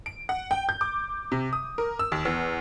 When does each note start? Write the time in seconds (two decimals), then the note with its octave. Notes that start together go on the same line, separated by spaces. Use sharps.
0.06 D7
0.29 F#5
0.51 G5
0.69 G6
0.81 D6
1.32 C3
1.53 D#6
1.78 A#4
1.99 E6
2.12 D#2
2.25 E2